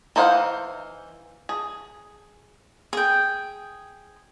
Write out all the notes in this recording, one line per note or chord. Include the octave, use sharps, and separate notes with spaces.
E3 D#4 C5 F5 F#5
G#4
G#4 G5